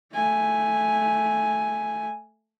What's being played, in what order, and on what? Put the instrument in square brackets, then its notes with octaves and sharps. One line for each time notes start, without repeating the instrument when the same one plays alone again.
[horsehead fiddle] A3 G#5